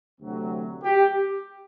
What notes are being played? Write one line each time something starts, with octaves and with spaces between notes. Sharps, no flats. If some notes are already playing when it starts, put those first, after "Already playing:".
D2 C3 F#3
G4